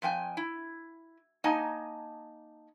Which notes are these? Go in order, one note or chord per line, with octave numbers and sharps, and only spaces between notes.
F2 F3 G5 G#5
E4
A#3 D#4 D#5 G#5 A5